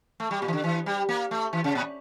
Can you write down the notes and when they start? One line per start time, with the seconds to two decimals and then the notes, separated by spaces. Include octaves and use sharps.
0.20 A3
0.31 G3
0.42 A#2
0.48 E3
0.53 D3
0.64 E3
0.86 G3
1.09 A#3
1.31 A3
1.53 E3
1.64 C#3
1.75 A#2